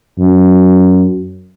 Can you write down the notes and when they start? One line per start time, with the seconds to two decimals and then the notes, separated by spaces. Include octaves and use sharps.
0.18 F#2